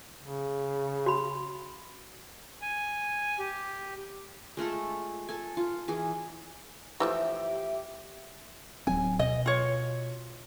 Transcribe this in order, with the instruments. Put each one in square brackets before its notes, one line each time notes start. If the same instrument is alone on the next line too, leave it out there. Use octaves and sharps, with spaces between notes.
[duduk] C#3
[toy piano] F#4 B5
[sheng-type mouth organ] G#5
G4
[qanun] G#3 A3 F4 A4
A4 G#5
F4
E3 G#4
[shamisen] E3 F3 A3 [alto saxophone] G4 [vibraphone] E5
[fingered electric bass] D1 F#3 C4 [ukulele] G#5
[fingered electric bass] B2 [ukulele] D#5
[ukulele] F4 C#5